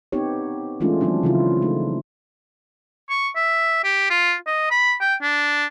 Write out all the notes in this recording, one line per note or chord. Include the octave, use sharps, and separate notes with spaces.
B3 C4 D#4 G4 C#5
E3 G#3 A3 C#4 D4 F4
D#3 F#3 G#3 C4 D4
C#3 E3 F3 E4 F4
A3 D#4
C#6
E5
G4
F4
D#5
B5
G5
D4